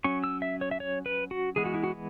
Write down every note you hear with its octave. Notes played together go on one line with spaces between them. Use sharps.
F#3 C#4 C#6
E6
E5
C#5
E5
C#5
B4
F#4
E3 G#3 B3 G#4
F#4
E4
F#4